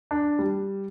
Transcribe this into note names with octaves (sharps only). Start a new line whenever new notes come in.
D4
G3